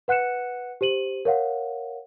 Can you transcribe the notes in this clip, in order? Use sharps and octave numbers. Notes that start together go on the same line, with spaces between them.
B4 F#5 F#6 C#7 E7
G4 C5 D#7 F#7
A#4 C#5 F5 F#5